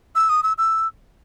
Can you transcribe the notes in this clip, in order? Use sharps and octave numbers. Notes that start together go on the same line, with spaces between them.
E6
D#6
E6
E6